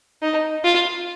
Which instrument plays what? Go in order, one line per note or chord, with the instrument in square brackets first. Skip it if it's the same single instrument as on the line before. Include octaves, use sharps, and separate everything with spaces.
[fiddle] D#4
F4